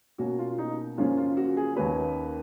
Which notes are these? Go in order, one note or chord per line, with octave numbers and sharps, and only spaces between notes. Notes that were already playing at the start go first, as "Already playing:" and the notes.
B2 A#3 C#4 F#4
F4
D#4
F#2 C#3 F3 A#3 C#4 F4
F4
F#4
G#4
D#2 D#3 A#3 C#4 B4